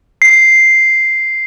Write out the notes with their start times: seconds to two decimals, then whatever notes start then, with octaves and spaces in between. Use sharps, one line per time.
0.22 C7